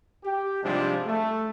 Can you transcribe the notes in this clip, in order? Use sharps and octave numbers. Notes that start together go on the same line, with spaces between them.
G4
G#2 C3 F3 G3 G#3 D4
A3